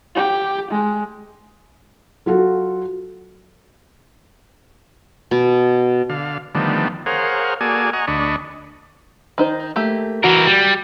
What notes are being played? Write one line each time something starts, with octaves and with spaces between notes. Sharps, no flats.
G4
G#3
F#3 F4 F#4 A4
B2
D3 F5
D3 D#3 F3 G3 A3 B3
G#4 A#4 C5 C#5 F5 F#5
A#3 F#4 G#4 A4 D5 G#5
D#5 F#5 G#5 A#5 C#6
D2 D4 D#5 B5 C#6
D#3 D#4 C5
A3 A#3 G4
E3 F#4 A#4
G3